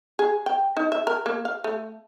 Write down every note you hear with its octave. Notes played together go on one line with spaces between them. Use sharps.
G#4
G5
D#4
E5
A#4
A#3
F5
A3